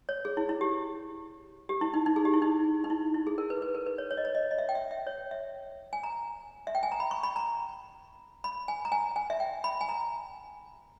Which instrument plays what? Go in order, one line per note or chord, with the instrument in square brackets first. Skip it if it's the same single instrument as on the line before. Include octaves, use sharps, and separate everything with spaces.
[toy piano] C#5
G#4
E4
E4
G4
G4
E4
D#4
D#4
G#4
G4
E4
D#4
D#4
E4
E4
G#4
A#4
B4
B4
A#4
B4
C#5
C#5
D#5
C#5
D#5
D#5
E5
G5
E5
E5
C#5
E5
G#5
A#5
E5
G5
G#5
A#5
B5
C#6
B5
A#5
B5
G#5
A#5
G#5
G#5
E5
G5
B5
G#5
A#5